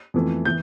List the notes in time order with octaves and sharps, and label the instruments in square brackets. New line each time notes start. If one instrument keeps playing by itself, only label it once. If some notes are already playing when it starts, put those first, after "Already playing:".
[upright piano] F2 E3 A3
E3 G6